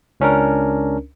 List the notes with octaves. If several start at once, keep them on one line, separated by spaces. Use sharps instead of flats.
C#2 C#4 D4 A#4